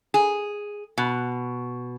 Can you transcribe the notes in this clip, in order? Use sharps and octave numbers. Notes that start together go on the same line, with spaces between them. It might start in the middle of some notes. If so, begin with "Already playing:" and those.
G#4
B2